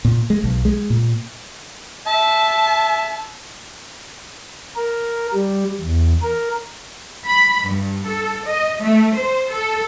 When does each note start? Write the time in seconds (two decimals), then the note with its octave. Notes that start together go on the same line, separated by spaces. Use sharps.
0.05 A#2
0.30 G#3
0.44 B1
0.65 G#3
0.90 A#2
2.07 E5 A5
4.76 A#4
5.33 G3
5.81 E2
6.22 A#4
7.26 B5
7.65 G2
8.05 A4
8.46 D#5
8.83 A3
9.13 C5
9.50 A4